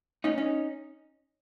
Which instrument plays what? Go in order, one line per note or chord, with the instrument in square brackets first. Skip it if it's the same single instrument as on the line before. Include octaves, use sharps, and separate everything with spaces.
[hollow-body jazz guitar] C#4 D#4
C#4 D#4